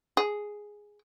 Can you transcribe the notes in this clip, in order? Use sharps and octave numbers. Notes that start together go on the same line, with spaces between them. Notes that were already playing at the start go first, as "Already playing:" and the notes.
G#4